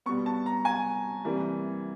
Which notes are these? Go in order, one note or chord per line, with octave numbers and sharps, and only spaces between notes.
B2 G3 B3 C#6
A5
A#5
G#5
C3 E3 G3 A#3